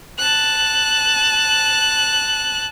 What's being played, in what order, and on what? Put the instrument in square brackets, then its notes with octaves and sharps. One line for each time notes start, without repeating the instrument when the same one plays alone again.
[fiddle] A5 F#6